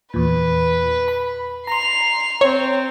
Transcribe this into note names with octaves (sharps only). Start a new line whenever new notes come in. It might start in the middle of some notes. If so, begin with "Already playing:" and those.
E2 A#2 B4
B5
A#5 C6 C7 F7
C4 C#5